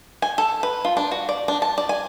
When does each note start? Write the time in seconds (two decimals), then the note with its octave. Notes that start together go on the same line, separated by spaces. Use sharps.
0.22 G#5
0.38 A4
0.63 B4
0.85 F4
0.97 D4
1.11 F#4
1.29 D5
1.48 D4
1.62 A5
1.78 D5
1.89 G#5